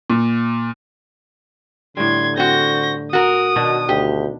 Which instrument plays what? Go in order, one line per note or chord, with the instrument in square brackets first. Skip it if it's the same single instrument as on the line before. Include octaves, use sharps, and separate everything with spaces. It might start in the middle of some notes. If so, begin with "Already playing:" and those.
[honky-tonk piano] A#2
[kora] A2 G3 [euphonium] D3 [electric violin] C6 G#6
[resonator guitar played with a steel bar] C4 F#4 [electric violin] G6 A#6
[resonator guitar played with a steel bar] F#4 A#4 [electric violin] D#6
[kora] B2 D#3 D4
[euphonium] D2 [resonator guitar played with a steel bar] G4